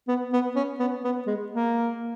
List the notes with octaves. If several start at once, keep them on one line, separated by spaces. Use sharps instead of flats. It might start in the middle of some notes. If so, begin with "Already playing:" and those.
B3
B3
C#4
B3
B3
G#3
A#3